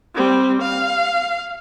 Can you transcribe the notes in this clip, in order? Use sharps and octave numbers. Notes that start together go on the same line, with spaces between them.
G3 C4
F5